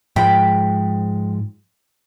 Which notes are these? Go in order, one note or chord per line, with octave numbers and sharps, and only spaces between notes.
G#2 F3 G#3 G5 B5